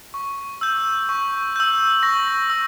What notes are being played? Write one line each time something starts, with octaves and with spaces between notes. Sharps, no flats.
C#6
E6 G6
C#6
E6 G6
C#6 A#6
E6